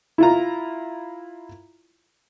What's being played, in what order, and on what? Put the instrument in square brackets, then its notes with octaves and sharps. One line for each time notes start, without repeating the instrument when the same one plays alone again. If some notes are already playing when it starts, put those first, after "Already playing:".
[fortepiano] E4 F4 A#5